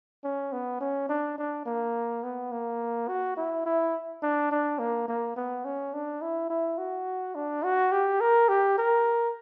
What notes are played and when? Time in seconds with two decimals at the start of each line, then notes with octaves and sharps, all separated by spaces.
0.24 C#4
0.53 B3
0.80 C#4
1.09 D4
1.38 D4
1.66 A#3
2.23 B3
2.52 A#3
3.08 F#4
3.37 E4
3.66 E4
4.23 D4
4.51 D4
4.79 A#3
5.08 A#3
5.36 B3
5.65 C#4
5.94 D4
6.22 E4
6.50 E4
6.78 F#4
7.35 D4
7.63 F#4
7.92 G4
8.21 A#4
8.49 G4
8.78 A#4